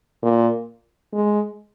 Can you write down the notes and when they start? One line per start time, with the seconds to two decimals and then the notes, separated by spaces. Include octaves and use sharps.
0.23 A#2
1.13 G#3